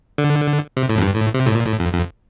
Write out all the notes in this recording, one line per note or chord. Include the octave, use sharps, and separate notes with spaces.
D3
C3
A2
F2
G2
A2
C3
A2
A#2
A2
F2
F2